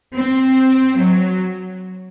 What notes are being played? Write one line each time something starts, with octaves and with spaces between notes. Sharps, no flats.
C4
F#3